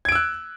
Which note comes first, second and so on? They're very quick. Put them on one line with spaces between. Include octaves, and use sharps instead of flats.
G#6 D7 E6 F#6